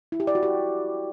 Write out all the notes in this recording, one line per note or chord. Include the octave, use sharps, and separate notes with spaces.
E4
G4
D5
F#4
G4